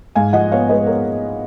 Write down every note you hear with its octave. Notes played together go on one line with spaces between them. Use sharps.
G#2 F5 G#5
F3 D#5 F#5
B3 C#5 F5
G#3 B4 D#5
A#4 C#5